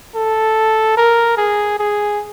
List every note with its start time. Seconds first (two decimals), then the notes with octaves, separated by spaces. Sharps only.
0.16 A4
0.97 A#4
1.37 G#4
1.79 G#4